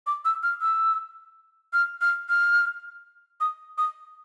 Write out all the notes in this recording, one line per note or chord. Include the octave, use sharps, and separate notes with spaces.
D6
E6
F6
E6
F6
F6
F6
D#6
D#6